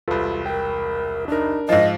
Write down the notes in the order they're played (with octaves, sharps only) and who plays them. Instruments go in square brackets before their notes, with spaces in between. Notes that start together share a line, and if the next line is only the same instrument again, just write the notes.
[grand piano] E1 C2 [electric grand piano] F4 A4 B4
[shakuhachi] A#4 [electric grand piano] G5
[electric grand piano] D4 A#4 [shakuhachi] D#4
[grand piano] G#2 F3 [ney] D#5 [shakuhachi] F5